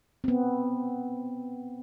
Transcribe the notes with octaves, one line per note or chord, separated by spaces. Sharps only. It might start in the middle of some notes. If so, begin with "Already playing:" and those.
B3 C4